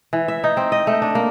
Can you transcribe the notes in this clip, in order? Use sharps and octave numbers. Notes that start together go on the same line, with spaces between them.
E3
E5
D#4
C4
D#5
A3
D4
A#3